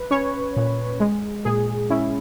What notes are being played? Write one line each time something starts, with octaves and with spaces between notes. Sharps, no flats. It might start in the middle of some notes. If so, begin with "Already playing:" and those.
Already playing: B4
C#4 C#5
A#2
G#3
A#2 G#4
C#4 E4